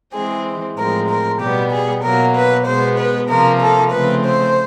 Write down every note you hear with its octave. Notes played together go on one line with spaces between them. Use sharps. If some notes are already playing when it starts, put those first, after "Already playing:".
E3 G#3 C4 G#4
A2 F3 G#3 C4 A#4
A#4
B2 G3 B3 G4
G#4
B2 F#3 A#3 A#4
B4
B2 G#3 B3 C5
B4
C3 F3 A#3 A#4
A4
C#3 F3 A3 C4 B4
C5